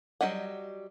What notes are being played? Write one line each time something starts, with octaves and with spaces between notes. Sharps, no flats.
F#3 G3 C#4 D#5 F#5